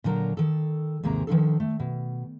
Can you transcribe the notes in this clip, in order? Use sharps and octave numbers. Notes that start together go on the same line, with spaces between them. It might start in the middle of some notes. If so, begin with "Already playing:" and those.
A#2 D3 F#3 A#4 A#5
D#3 A4
D#2 G#2 C3 A#3 G#4 A#5
D#3 F3 D4 A4
A3
B2